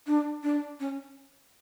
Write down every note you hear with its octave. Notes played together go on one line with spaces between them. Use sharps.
D4
D4
C#4